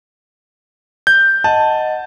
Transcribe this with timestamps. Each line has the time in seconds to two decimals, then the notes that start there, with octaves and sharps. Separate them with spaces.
1.07 G6
1.44 D#5 F#5 A5